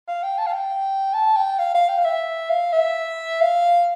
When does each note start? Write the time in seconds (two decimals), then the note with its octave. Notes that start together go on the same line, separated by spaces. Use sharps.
0.08 F5
0.23 G5
0.38 A5
0.47 F5
0.54 G5
1.14 A5
1.37 G5
1.59 F5
1.75 F5
1.89 G5
1.98 F5
2.05 E5
2.50 F5
2.73 E5
3.41 F5